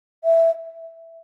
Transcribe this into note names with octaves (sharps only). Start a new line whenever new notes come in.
E5